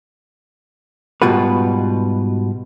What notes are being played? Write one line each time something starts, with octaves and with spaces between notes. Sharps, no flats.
G#2 B2 G3 F4 F#4 B4